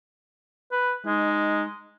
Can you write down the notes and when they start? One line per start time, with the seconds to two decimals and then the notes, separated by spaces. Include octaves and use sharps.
0.72 B4
1.06 G#3 D#4